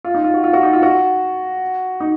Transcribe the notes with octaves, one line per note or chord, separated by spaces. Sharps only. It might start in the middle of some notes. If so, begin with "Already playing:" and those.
F4
D#4
F4
F#4
F4
F#4
D#4
F4
F#4
D#4